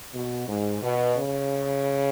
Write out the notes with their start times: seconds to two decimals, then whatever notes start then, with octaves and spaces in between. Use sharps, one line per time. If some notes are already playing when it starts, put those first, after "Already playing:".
0.14 B2
0.48 G#2
0.82 B2
1.16 C#3